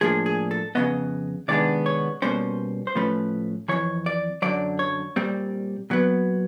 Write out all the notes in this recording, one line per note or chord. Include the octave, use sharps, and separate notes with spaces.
A2 F3 A#3 D4 G#4
G#4
A4
F2 C#3 F#3 B3 D#5
C3 D#3 G#3 B3 D4 D5
C#5
B2 G3 A#3 C#4 C5
C5
A2 F3 A3 C#4 B4
F2 C#3 E3 C#5
D5
F#2 D3 F#3 D5
C#5
A#2 G3 C4
A#2 F#3 B3